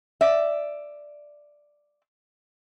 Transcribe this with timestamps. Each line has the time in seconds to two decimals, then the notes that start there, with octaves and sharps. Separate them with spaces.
0.21 D5 E5